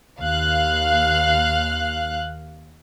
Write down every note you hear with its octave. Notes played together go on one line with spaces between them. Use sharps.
D#2 F5 F#6